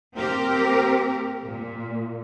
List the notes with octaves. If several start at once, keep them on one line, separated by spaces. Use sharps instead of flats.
A#3 C4 G4 A#4
A#2